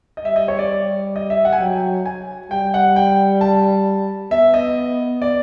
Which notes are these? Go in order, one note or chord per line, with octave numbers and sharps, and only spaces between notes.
D#5
G3 E5
D#5
C#5
D5
D#5
E5
F#5
G#5
F#3 G5
G#5
G3 G5
F#5
G5
A5
B3 E5
D#5
D5